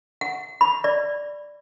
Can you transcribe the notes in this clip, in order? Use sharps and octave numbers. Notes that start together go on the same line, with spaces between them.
F#5
B5
D5